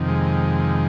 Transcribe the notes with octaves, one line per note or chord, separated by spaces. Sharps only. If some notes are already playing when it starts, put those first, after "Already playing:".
Already playing: F2 C3 D#3
G#3